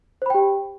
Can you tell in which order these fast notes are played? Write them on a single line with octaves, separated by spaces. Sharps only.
C5 B5 G5 G4